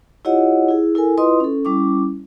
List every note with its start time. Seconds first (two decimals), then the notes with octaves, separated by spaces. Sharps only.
0.25 E4 F4 G4 C#5 D#5 F#5
0.68 E4 G#4
0.95 E4 A4 A#4 G#5
1.18 E4 F4 B4 D#5 C6 D#6
1.40 C#4 A4
1.65 G3 C#4 E4 D6